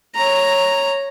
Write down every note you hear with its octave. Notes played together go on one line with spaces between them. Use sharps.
C#5 A#5